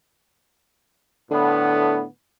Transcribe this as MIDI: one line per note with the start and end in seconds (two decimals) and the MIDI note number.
1.31 2.06 45
1.31 2.04 50
1.31 2.06 59